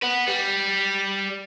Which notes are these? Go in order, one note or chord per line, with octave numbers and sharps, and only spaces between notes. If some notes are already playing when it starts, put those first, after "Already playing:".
B4 F#5
G3